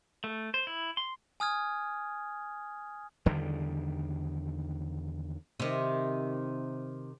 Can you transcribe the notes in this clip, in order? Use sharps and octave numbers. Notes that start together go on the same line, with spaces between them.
A3
C5
E4
C6
G#5 D#6 F6 G#6
E2 D3 D#3 G3
C3 D#3